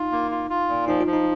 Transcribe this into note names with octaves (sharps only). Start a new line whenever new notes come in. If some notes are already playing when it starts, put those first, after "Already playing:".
Already playing: D#4 F4
A#3
F4
F4
A#2
F3 D#4
F4
F3
D#4